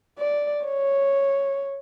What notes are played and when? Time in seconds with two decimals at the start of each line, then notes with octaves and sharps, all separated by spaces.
0.19 D5
0.65 C#5